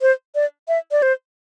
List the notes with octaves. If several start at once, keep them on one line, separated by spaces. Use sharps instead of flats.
C5
D5
E5
D5
C5